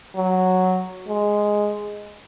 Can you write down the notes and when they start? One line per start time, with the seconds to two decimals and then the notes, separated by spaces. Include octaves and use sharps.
0.16 F#3
1.08 G#3